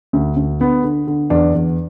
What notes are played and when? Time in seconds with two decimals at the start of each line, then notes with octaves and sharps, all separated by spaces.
0.13 D2
0.36 D2
0.60 D3 B3
0.84 D3
1.07 D3
1.30 E2 D4
1.54 E2